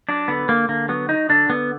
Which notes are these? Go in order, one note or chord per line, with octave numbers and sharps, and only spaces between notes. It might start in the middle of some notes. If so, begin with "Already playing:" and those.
F#3 D4
D3 B3
D3 A#3
D3 A#3
F#3 B3
F#3 D#4
D3 D4
D3 B3